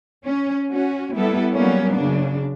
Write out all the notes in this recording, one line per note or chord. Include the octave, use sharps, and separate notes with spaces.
C#4
C#4 F#4
G3 B3 E4 A4
F#3 G3 A#3 B3 C#4
F#2 C#3 D4